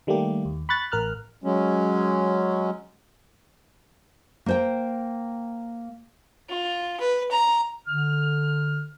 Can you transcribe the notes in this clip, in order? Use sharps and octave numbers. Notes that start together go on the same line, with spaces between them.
D#3 G3 A3 A#3 G4
D#2
B5 C#6 F#6 A6
A1 A#4 F6 F#6
F#3 G#3 C#4
A#3 C5 G5
F4
B4
A#5
D3 F6